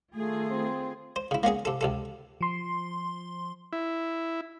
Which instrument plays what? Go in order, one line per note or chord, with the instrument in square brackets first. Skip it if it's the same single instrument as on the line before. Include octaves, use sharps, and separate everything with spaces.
[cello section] D#3 F4 G#4 [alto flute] A3
[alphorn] C4
[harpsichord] C5
C#3 E4
A#3 B3 C#4 G#4
C3 A4
C#2 C3 A4
[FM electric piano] F3 C6
[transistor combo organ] E4